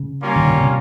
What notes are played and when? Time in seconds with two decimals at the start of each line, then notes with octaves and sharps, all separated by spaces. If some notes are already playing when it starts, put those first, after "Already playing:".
Already playing: C#3
0.22 G3 A#3 C#4 F4
0.36 D#3
0.47 C#3
0.58 C3